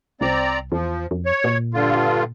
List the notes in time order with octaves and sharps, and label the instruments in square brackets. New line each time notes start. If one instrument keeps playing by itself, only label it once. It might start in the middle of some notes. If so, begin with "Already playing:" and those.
[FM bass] C2 [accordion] C4 D5 A#5
[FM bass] E2 [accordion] F3
[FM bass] F2
[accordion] C#5
[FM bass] A#2
[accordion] G2 D3 F4